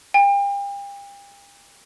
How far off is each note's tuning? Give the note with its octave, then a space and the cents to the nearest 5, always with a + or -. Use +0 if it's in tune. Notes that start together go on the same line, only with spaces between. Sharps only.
G5 +40